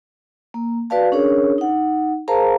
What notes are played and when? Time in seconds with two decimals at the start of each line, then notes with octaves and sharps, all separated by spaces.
0.54 A#3
0.90 F#4 B4 D5 F5 A5
1.12 C#4 D4 G#4 A#4 C#5
1.58 D#4 F#5
2.28 G#4 A#4 C5 F5 A5 A#5